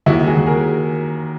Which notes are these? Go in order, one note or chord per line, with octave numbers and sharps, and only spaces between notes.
D#2 E4 F#4
F#4 G#4
D#2
G#4 A#4